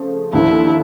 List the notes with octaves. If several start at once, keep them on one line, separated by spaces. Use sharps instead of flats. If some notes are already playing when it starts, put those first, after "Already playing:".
Already playing: C#3 F3 A3
D#2 D3 F3 A#3 E4